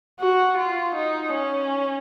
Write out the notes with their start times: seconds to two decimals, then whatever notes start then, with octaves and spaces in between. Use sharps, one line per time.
0.20 F#4
0.58 F4
0.95 D#4
1.33 C#4